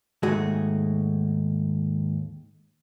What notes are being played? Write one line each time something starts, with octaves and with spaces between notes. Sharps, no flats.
D#2 G#2 A3 F#4 G#4